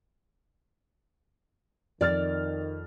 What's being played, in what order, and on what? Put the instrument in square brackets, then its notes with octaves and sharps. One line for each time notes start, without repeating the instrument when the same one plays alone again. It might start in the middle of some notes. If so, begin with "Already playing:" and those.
[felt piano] F2 F6 A6 [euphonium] D#3 [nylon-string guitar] D5